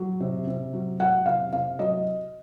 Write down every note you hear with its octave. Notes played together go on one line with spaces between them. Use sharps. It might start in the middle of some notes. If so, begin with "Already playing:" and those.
Already playing: F#3
C3
C3
F#3
F#3 F#5
C3 F5
C3 F5
F#3 D#5